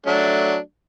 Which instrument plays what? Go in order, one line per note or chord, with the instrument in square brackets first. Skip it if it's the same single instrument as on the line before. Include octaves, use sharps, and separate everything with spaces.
[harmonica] F#3 A3 D4